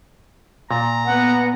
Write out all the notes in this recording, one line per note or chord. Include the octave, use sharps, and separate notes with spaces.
A#2 A#5
B3 F#5